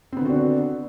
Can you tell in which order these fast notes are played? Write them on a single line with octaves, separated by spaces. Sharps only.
C4 B3 D3 F#4 D4